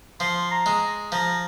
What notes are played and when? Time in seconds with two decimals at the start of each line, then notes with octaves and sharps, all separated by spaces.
0.20 F3 C6
0.51 A#5
0.66 G#3
1.12 F3 A#5